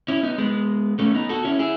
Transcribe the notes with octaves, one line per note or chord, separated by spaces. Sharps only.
C#4 E4
B3 D#4
G#3 B3
A3 C#4
B3 D#4
F#4 A4
C#4 E4
E4 G#4